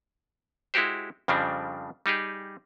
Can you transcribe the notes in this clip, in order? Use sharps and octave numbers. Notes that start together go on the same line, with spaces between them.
G#3 E4 F#4 G4 C5
F2 C#3 F3 G3 C4 D4
G3 D#4 G4 G#4